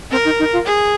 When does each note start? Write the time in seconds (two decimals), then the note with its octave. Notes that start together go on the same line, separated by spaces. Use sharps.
0.11 C4 A#4
0.25 D#4
0.39 D#4
0.53 F4
0.66 G#4